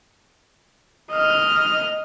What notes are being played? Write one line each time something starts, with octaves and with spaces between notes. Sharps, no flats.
D#5 F6